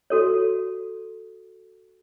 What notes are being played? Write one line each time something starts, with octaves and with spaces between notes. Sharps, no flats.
F#4 A4 C#5